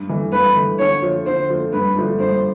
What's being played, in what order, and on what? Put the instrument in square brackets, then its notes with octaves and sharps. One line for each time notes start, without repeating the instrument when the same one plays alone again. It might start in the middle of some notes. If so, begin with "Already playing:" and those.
Already playing: [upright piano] G2
E3 A3
[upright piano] G2 [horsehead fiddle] B4
[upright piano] E3 A3
[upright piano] D3 [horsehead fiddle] C#5
[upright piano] F3 A3
[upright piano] D3 [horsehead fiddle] C5
[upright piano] F3 A3
[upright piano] G2 [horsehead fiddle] B4
[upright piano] D3 F3 A3 D4
[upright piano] G2 [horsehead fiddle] C5